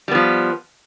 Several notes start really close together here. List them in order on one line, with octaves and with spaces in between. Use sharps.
G3 B3 F3